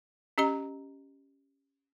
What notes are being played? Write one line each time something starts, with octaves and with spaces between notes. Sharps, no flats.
C#4 G4 D#5 A#5